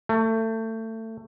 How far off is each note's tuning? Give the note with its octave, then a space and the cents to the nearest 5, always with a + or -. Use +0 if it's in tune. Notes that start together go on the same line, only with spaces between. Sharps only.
A3 +25